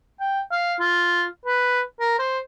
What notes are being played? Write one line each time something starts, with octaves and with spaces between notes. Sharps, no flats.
G5
F5
F4
B4
A#4
C5